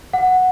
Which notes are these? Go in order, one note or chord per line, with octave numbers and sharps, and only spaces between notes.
F#5